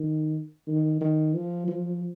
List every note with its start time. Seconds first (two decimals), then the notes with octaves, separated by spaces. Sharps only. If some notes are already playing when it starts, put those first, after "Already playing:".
Already playing: D#3
0.68 D#3
1.01 D#3
1.35 F3
1.68 F3